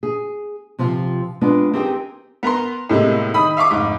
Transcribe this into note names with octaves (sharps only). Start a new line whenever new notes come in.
G#4
C3 F3 C4 F4
G#3 B3 C4 D4 F4
C4 D#4 G4 G#4 A#4 G5
B3 A#4 A#5 C6
A2 C3 G#3 A#3
D#3 B5 D#6
E5 F5 C#6 D6
F1 G#2